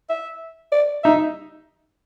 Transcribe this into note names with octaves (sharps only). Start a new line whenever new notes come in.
E5
D5
D#4 E5